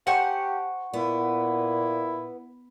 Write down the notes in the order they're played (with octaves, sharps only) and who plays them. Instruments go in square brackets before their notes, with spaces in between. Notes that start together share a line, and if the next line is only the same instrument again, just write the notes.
[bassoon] G4 [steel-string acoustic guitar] C5 G#5 A5 [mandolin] F#5 C#6
[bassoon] A#2 [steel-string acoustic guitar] B3 [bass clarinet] E4